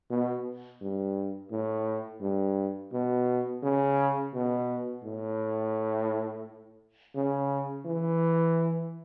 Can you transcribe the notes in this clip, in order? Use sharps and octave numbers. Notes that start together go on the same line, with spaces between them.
B2
G2
A2
G2
B2
C#3
B2
A2
C#3
E3